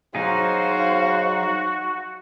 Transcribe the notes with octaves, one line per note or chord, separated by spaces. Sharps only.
F#3 D#4 F#4 G#4 C5 F5